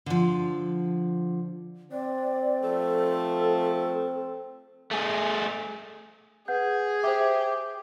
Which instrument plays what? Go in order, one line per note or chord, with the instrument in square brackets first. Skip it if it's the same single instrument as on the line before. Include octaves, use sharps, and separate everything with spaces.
[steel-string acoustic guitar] D3 F3
[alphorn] C4 [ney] D5
[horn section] F3 A3 [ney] A4
[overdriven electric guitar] A3 G#4
[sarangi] G#4 [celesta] B4 F#5 G6
[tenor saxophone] G4 [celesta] C5 E5